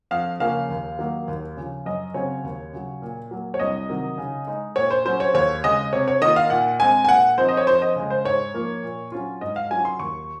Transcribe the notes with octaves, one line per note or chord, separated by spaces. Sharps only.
F2 F5
C#3 F3 A#3 C#4 F5
D#2
D#3 F#3 A#3 D#4
D#2
C#3 F3
F#2 D#5
C#3 F#3 C4 C#5
D#2
C#3 F#3
A#2
F#3 A#3
C#5
C2 D#5
C3 D#3 F#3
C#3
G#3 D#4
A#2 C#5
C5
F#3 C#4 C5
C#5
D#2 C#5
C#3 G#3 D#5
C3 C#5
C#5
D#3 A#3 F4 D#5
F5
A#2 F#5
G#3 C4 G#5
G#5
A#2 F#5
F3 C4 D#4 C5
D#5
C#5
F2 C5
D#5
C#3 G#3
C5
G#2 C#5
F3 A#3
A#2
F#3 C#4 F4
G#2 D#5
F5
F#3 C#4 F4 G#5
C6
D#2 C#6